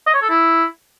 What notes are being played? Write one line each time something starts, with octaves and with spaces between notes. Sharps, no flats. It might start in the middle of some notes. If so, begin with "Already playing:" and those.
D#5
C#5
A4
E4